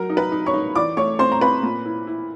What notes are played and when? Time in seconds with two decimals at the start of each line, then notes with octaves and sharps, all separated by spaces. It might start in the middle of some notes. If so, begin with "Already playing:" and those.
Already playing: F#3 A#4 A#5
0.10 D#4
0.17 B4 B5
0.32 D#4
0.46 C#5 C#6
0.54 D#4
0.75 E3 D5 D6
0.97 A3 C#5 C#6
1.19 C4 C5 C6
1.32 A#5
1.41 C4 B4 B5
1.63 A#2
1.85 E4
2.07 E4